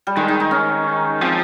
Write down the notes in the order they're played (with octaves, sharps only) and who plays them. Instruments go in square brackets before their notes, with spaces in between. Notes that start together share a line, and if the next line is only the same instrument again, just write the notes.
[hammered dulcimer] G3
[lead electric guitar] D#3 [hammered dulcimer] G#3
[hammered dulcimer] D#4
D#4
C#4
[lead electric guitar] F3 [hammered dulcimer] C4